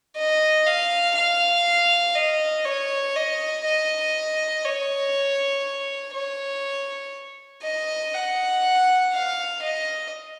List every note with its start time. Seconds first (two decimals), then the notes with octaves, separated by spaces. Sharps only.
0.17 D#5
0.67 F5
1.16 F5
2.15 D#5
2.65 C#5
3.16 D#5
3.65 D#5
4.65 C#5
6.14 C#5
7.63 D#5
8.14 F#5
9.14 F5
9.63 D#5